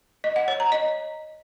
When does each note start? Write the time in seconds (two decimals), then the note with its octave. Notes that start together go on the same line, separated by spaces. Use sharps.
0.24 D#5
0.36 F#5
0.48 C#5
0.60 A#5
0.72 D#5